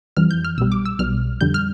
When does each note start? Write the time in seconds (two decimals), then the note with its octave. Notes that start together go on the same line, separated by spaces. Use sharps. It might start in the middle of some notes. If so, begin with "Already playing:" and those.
0.17 F2 E3 G3 F6
0.31 G6
0.45 F6
0.58 B1 B2 G3 E6
0.72 D6
0.86 E6
0.99 B1 B2 G3 F6
1.41 F2 D3 G3 G6
1.54 F6